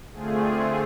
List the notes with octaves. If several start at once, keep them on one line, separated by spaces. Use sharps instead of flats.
D3 A3 C4 F4 G#4